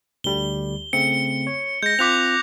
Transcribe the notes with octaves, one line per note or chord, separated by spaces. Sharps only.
D2 D3 G3 G7
C#3 A3 C4 C#7
C#5
G#3 G6 A#6
C4 F4 D6 F#6 B6 F7